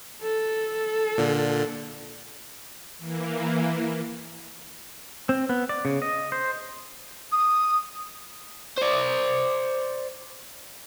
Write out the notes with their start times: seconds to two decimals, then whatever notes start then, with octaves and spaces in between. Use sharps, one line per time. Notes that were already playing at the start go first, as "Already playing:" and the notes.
0.22 A4
1.18 A#2 D3
2.98 E3 A#3
5.29 C4
5.49 B3
5.69 D5
5.85 C#3
6.02 D#5
6.32 C5
7.32 D#6
8.77 C5 D5